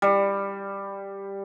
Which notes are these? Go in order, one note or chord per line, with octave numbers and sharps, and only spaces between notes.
G3